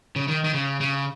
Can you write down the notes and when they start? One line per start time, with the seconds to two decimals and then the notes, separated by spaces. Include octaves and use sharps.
0.16 C#3
0.28 D#3
0.44 D#3
0.54 C#3
0.81 C#3